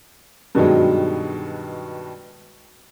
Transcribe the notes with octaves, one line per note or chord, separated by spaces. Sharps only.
G2 B2 D#3 F#3 G#3